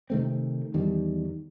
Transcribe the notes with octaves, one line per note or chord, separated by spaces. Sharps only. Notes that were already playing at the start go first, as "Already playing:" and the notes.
C3 D#3 A3 C4
E2 D#3 G3